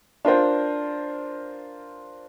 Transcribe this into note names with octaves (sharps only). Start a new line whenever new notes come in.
D4 F4 A#4 C5